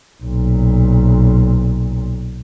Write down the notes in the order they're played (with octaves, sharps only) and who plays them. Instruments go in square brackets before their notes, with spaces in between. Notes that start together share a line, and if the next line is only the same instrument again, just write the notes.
[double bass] B1 A#2